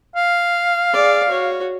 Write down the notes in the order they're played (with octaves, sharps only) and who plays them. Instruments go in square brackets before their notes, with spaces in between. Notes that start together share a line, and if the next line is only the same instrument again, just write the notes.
[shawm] F5
[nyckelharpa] G#4 D5
F#4 C#5